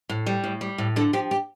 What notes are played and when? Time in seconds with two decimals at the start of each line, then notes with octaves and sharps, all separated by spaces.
0.09 A2
0.26 G3
0.44 A2
0.61 G3
0.78 A2
0.96 D3 A4
1.13 F3 G4
1.31 G4